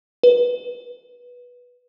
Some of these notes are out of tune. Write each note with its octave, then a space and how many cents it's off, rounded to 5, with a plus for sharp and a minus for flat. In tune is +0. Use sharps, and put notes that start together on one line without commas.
B4 -10